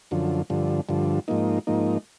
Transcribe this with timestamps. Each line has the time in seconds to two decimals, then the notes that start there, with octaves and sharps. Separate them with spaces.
0.11 F#2 D3 F3
0.50 G2 D3 F3
0.89 G2 D3 F3
1.28 G#2 F3 A#3 D#4
1.67 G#2 F3 A#3 D#4